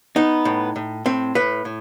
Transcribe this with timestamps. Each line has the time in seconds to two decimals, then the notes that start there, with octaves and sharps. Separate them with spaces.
0.16 B3 D#4
0.45 A2
0.76 A2
1.06 A2 C4
1.35 A2 B4
1.65 A2